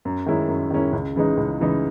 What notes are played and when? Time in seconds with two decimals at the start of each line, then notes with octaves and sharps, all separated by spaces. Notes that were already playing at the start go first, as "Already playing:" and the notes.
0.05 F#2
0.26 D#3 G#3 C#4 E4
0.48 F#2
0.71 D#3 G#3 C#4 E4
0.93 C#2
1.16 C#3 E3 G#3 D#4
1.37 C#2
1.60 C#3 E3 G#3 D#4